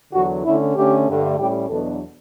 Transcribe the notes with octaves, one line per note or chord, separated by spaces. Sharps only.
E2 D3 F#3 F#4
D3 A3 C#4 E4
D3 A3 C#4 G4
G2 D3 A3
A2 G3 C#4 G4
E2 B2 F#3 B3 D4 A4